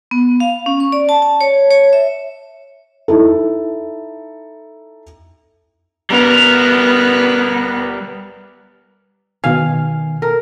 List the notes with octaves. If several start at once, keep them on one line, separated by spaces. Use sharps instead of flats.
B3
F5
C#4
C#6
D5
A5
A5
C#5
C#5
E5
D#4 E4 A4
G3 B3 A#4
B2 D#3 F5 G#5
A4 A#4